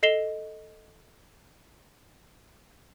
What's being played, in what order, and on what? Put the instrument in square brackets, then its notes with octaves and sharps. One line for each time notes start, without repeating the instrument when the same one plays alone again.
[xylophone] A4 D#5 C7 E7 F7 G7